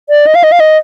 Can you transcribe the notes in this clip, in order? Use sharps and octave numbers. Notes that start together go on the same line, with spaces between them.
D5
D#5
F5
D#5
F5
D#5